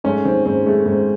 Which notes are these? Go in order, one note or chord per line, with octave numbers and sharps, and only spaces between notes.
G#2 A3 C#4
D#3 C4
G#2 C4
G#3 A3
G#2 C4